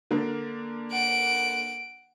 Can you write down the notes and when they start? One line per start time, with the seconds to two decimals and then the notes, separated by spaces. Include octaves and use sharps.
0.11 D3 A#3 D4
0.92 F#5 D7